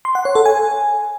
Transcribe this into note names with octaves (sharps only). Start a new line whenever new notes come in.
C6
F#5
C#5
A4
G#5